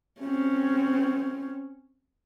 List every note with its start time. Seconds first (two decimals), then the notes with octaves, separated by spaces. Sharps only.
0.21 C4 C#4